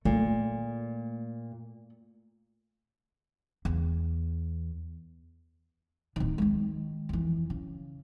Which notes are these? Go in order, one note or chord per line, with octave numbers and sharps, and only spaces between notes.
A#2 A3
E2
D1 D#3
D#3 G#3
F2 E3
C#3